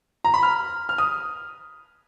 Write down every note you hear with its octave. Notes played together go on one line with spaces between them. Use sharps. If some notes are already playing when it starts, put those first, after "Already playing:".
A#5
B5
F6
F6
D#6